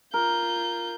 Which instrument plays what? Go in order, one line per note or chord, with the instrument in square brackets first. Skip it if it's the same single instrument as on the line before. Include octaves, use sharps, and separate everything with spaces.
[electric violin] F4 G6 [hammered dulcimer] A#4